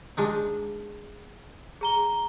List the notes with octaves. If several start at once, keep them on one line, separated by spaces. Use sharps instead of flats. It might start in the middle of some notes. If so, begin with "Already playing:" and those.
G#3 D4 D#4
G#4 A#5 G7